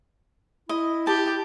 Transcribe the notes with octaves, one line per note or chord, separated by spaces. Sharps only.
E4 D#5
G4 A5